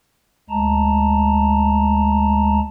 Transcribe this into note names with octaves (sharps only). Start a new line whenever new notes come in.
D2 G#3 A5 A#5